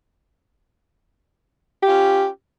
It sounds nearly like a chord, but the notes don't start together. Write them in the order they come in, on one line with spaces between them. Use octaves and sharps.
G4 F4 C#4